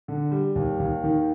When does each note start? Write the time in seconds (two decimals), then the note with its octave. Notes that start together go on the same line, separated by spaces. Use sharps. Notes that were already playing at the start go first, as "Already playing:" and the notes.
0.08 D3
0.31 G3
0.56 D#2
0.79 D#2
1.04 D#3